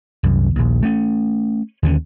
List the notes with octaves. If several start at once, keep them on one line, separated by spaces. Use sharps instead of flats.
C2 F#2
A#1 D#2
A3 C#4
D#2 D3 F3 C#4